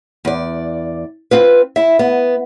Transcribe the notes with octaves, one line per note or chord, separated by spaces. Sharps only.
E2 D5
C4 F4 B4
E4 E5
B3